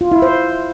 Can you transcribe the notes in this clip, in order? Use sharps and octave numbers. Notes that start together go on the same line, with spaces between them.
F4
E4
C5